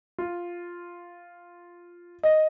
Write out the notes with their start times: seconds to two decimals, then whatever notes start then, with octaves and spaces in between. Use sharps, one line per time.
0.18 F4
2.23 D#5